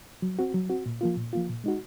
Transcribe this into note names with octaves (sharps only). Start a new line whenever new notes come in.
F#3
C4 F#4
F#3
C4 F#4
A#2
F3 A#3 F4
A#2
F3 A#3 F4
A#2
G#3 D#4 F#4